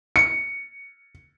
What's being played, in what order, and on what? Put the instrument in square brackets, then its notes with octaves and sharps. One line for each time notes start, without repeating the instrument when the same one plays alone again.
[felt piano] C#7